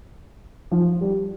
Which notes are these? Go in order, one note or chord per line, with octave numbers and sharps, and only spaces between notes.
F3
G3